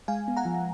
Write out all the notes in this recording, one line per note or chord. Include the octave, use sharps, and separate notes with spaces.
G#3 F5 G#5
B3
F#5 A#5
F3